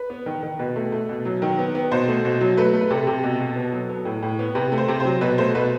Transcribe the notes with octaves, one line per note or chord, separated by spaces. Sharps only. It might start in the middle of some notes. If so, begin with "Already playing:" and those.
Already playing: B4
B3
D#3
D#3
B2 B4
A3
A3
B2
F#3
D#3
B3
B3
B2 C5
A3
B2
F#3
A3 B4
A3
B4
C3 A4
C3
B2
B2
B3
F#3
B3
A2
A2
B3
C3 B4
A3
C5
C3
F#3 C5
B2 B4
A3 C5
B2 B4